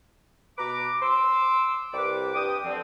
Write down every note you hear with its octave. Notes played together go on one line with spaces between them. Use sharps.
B2 B4 A#5 D6
C6 D6 E6
C2 G3 B4 D6
G2 G5 D#6
D3 F3 C4